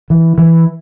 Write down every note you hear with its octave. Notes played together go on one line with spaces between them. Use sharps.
E3
E3